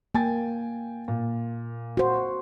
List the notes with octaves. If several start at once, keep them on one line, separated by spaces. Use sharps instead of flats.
A#3 G5 G#5 A6
A#2
F#4 C5